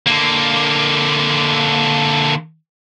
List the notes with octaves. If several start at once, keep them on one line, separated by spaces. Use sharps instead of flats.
D3 A#3